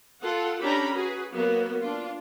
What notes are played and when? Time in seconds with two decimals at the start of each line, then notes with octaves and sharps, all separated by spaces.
0.21 F4 A4 F#5
0.62 C#4 D4 G4 A4 A#5 B5
0.93 F#4 G#4 B4
1.32 F#3 A#3 B3 F#4
1.80 D4 F4